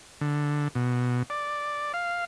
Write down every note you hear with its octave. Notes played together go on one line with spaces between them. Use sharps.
D3
B2
D5
F5